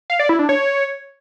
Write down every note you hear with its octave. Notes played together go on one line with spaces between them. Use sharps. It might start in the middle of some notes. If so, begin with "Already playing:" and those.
F5
D5
E4
D4
C#5